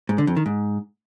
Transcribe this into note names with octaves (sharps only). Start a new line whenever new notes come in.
G#2
D3
F2
D#3
G#2